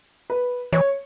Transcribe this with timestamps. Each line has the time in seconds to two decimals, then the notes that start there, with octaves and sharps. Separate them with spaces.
0.30 B4
0.72 E3 C#5